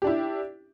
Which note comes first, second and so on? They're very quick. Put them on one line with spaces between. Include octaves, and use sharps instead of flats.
G4 D4 E4